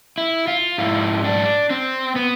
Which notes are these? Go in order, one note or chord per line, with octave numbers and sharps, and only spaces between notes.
E4
F4
G#2 F3 E4
D4
C4
B3